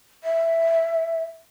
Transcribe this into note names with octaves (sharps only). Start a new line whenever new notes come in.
E5